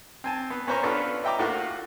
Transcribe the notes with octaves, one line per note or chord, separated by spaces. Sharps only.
C4 G#5 A5
B3
A#2 C#4 B4 C5 A#5 C#6
B3 C#4 D4 F4 A4 B4
D#5 E5 G5 A#5 D6
A2 A#3 F4 F#4 F#5